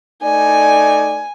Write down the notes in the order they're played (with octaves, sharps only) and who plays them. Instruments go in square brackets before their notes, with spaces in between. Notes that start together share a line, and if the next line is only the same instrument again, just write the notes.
[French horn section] A3 D#4 D5 [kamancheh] G#5